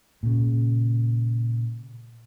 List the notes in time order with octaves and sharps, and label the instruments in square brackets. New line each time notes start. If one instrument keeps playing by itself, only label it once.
[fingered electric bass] A#2 C#3